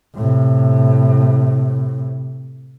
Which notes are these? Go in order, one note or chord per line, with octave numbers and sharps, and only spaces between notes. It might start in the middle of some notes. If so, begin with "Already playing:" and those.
A2 C3